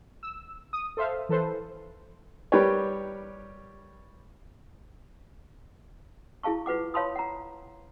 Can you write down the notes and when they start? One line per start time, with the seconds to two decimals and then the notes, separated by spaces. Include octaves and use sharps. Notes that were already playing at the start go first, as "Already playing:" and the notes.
0.23 E6
0.73 D#6
0.97 A4 C5 E5 F5
1.29 E3 A4 B4 C5
2.52 G3 G4 A#4 B4 C#5
6.43 E4 G#4 F5 A5 C#6
6.66 F4 B4 F#5 D6
6.94 C#5 F5 A5 B5 C6 D#6
7.16 F#5 A#5